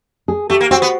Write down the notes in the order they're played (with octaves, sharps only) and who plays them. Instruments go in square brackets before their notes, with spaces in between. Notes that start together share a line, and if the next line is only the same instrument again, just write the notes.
[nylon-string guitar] G#4
[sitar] A3 [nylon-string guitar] G4
[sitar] A#3
[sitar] C4 [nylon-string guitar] F#4
[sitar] B3